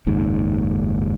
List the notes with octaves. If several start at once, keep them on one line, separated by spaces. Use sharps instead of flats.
F#1 D#2 G#2